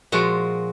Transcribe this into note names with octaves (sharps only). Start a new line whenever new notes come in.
A#2 F3 G#3 F#4